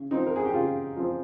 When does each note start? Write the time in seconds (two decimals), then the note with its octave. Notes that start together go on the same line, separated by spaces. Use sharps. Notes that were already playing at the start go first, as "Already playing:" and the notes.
Already playing: C#3
0.11 F3 C4 D#4
0.27 A#4
0.36 G#4
0.45 G4
0.53 C#3 F4
0.97 F3 C4